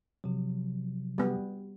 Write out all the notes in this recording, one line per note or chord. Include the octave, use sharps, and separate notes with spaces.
C3 F3 F#3
G3 B3